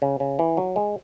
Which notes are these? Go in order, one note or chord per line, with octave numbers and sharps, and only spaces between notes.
C#3
C#3
E3
F#3
G#3